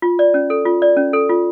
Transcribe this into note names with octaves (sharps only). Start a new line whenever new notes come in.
F4
D5
C#4
A4
F4
D5
C#4
A4
F4